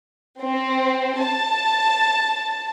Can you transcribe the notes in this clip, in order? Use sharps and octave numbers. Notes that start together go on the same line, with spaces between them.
C4
A5